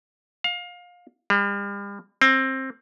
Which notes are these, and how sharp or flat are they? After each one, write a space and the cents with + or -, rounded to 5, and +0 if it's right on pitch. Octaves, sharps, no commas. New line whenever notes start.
F5 +25
G3 +40
C4 +20